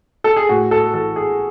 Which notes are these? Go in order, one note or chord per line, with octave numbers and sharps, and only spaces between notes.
A4
G#4
A2 F#4
A4
E3 A4
G#4